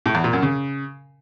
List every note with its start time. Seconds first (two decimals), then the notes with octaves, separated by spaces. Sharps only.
0.06 A2
0.15 E2
0.24 A#2
0.33 F#2
0.42 C#3